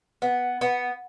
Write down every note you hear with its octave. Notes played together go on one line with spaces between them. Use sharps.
B3
B3